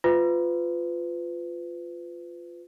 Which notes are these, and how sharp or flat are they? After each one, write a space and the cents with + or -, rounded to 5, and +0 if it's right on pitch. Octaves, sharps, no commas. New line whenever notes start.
F4 +0 B4 +30